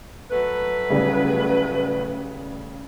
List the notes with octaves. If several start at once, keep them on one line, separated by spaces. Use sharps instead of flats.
F#3 A3 B4
A2 C#3 G3